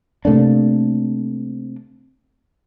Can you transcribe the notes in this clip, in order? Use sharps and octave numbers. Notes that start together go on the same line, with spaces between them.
C3 A3 A#3 D4